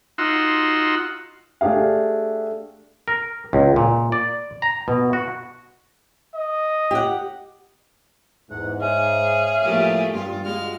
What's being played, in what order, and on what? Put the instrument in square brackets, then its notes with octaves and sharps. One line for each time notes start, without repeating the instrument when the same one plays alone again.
[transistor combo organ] D#4 F4 F#4 F#5 C6 E6
[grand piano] A3 D4 G4 G#4 F5
[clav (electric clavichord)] A#4
C#2
A#2
D5
A#5
B2
F#4
[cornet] D#5
[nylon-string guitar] G4 F#5
[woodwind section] E2 F#5 [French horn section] G#2
[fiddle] G#4 [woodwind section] C#5 E5 F5
[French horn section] A2 F3 A#3 [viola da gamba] A3 G4
[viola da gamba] G2 F4 [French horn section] G3
[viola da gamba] G#3 [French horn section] F4 F#4 [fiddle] F6